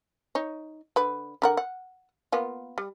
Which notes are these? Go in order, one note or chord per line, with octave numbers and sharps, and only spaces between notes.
D#4 C#5
D3 B4
D3 A#4 F#5
F#5
A#3 B3 F4
G3